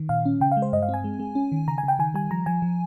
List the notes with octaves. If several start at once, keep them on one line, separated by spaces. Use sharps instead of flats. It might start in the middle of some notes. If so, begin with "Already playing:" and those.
Already playing: D#3
A#2 F5
C#4
C#3 G5
F5
G#3
C5
G2 D#5
F5
C4
G#5
G#3
G#3
C#4
D#3
C#3 A#5
G#5
C#3 G5
D#3 G#5
G3 G#5
F3 A#5
F3 G#5
F3